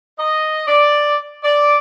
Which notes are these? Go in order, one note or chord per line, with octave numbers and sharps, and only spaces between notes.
D#5
D5
D5